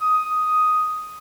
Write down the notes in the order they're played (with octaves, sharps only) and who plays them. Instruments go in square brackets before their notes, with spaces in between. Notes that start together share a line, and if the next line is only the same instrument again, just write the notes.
[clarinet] D#6